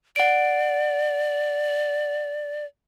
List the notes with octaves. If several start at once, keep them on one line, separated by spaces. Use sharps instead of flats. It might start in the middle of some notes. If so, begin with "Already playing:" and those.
D5 F#5 D7